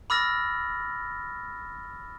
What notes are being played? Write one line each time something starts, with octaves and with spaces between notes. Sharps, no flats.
B5 D6 E6 F6 A6 A#6